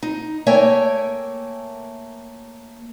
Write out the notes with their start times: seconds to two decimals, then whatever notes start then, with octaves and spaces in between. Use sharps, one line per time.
0.02 D#4
0.46 A3 A#3 C#5 E5 G5 G#5